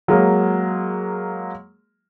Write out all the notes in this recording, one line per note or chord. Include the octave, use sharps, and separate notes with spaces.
F#3 G#3 A#3